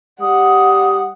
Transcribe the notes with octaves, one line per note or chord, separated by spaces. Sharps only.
G3 F#5 D#6